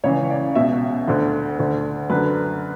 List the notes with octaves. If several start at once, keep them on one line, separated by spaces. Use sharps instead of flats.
C#2 C#3 E3 C#5
D5
C#2 B2 E5
D2 D3
D2 D3
F#2 D3 B4